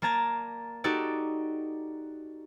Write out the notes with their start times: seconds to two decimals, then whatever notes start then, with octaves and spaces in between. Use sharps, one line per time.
0.02 A#3 D5 A5 A#5 G#6 A6
0.84 D#4 F#4 G4 A4 D5